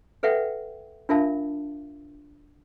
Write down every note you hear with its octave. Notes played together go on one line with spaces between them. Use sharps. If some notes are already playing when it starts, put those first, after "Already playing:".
A4 B4 E5 F#5 G5
D4 F4 A#4 E5 F5 A5